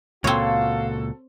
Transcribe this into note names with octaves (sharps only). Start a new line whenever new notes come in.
C#2 A#2 C4 F#4 A4 C#5 F5